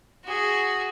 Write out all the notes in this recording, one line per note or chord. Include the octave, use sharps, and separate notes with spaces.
F#4 G#4